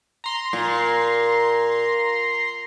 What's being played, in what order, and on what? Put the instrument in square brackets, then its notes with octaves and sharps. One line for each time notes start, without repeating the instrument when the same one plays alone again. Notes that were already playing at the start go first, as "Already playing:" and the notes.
[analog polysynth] A#5 C6
[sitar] A#2